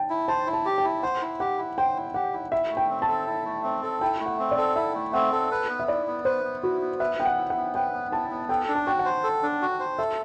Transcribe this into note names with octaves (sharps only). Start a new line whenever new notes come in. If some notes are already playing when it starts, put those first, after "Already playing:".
Already playing: G5 A5
E4
C5 A5
E4
A5
G4
G5
E4
C5 F#5
E4
G4 F#5
E4
C5 G5
E4
G4 F#5
E4
E4 E5
A3
G5
C4
A5
A4
E4
A3
C4
A4
E4 G5
A3
F#5
C4
D5
A4
E4 E5
A3
C4 F#5
A4
B4
B3
E5
E4 D5
B3
B4 C5
B3
E4 F#4
B3
B4 E5
B3 G5
F#5
E4
F#5
B3
B4 G5
B3
E4 A5
B3
A4 G5
D4
A5
F#4 G5
F#5
C5
A4
D4
F#4
C5
A4 E5